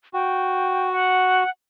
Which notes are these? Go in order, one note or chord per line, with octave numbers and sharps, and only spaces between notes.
F#4 G5
F#5